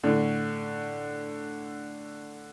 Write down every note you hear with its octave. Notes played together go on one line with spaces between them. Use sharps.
A2 D3